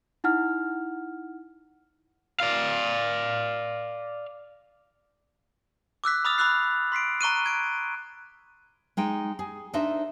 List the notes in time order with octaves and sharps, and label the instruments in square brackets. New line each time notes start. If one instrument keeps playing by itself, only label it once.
[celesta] D#4 E4 F#5 F6
[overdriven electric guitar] D5 F5
[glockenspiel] D6 E6 F#6 B6
B5 D6 D#6 F6 A6 F7
B5 D6 E6 F#6 C7
C6 B6 C7 D7
A#5 C#6 F#6 D#7
G#6 D7
[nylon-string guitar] G#3 D#4 G5
G#4
D4 D#4 A4 C5 D#5 E5